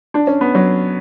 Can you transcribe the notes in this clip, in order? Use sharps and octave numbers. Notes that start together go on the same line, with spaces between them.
D4
C#4
B3
F#3